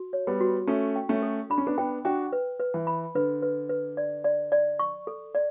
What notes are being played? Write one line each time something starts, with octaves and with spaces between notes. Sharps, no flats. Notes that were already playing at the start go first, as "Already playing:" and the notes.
Already playing: F#4
C#5
G3 B3
F#4
A3 C#4 A4
G5
A3 C#4
A4
D4 B5
C#4
B3 D4
B3 D4 G5
D4 F#4 G5
B4
B4
E3
B5
D3 B4
B4
B4
D5
D5
D5
C#6
A4
D5